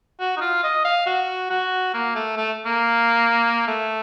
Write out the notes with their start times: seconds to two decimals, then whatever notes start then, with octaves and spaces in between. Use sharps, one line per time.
0.20 F#4
0.37 D#4
0.41 F4
0.63 D#5
0.85 F5
1.06 F#4
1.50 F#4
1.94 A#3
2.15 A3
2.37 A3
2.66 A#3
3.67 A3